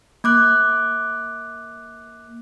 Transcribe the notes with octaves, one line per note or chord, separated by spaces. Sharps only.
A#3 D6 F#6